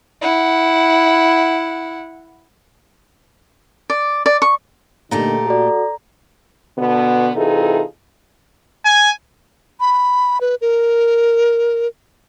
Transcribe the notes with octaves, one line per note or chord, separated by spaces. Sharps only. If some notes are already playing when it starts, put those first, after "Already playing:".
E4 F#5
D5
D5
C#6
A#2 D3 A3 A#3 D#4 G4 A#5
F#4 A4 D5
B2 D3 B3
C3 E3 D#4 F4 G#4 A4
G#5
B5
B4
A#4